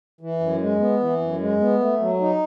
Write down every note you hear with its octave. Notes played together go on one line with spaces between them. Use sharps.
E3
F#2
G#3
B3
E3
F#2
G#3
B3
A3
F#3
D#4